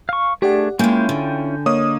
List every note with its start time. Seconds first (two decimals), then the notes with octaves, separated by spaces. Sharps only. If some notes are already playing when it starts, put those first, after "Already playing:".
0.09 F5 C#6
0.42 A3 D4 G4 G#4 D5 F#5
0.79 G#3 A#3 C#4 E4 F4 G5 G#5 G6
1.09 D3
1.66 A#3 C#5 D#5 C#6 D#6